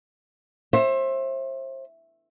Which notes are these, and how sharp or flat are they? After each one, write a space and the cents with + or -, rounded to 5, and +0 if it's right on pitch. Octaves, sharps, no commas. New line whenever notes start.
C5 +30 E5 +0